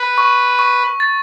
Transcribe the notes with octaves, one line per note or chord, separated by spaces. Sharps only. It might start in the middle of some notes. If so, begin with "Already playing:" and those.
Already playing: B4
C#6
C#6
A6